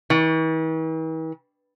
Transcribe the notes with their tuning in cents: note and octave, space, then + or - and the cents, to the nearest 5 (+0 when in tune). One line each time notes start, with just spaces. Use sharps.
E3 -45